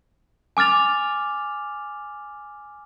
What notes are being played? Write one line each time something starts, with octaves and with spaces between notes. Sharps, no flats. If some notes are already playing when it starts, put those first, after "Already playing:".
G#5 D6 F6 A6 F7